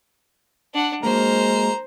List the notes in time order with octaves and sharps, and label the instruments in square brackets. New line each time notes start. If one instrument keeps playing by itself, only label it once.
[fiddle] D4 F#5
[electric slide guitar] F#3 A#3 [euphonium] G#3 [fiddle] C5 [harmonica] A#5